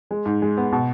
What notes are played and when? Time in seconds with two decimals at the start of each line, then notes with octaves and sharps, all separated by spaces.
0.11 G#3
0.26 G#2
0.42 G#3
0.57 B3
0.72 B2